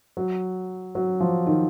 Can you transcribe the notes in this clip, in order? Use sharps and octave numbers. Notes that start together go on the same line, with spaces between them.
F#3
F#3
F3
D#3